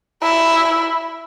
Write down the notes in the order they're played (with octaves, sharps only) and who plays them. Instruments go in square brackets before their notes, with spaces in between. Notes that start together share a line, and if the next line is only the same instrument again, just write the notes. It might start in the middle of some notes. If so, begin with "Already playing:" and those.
[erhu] E4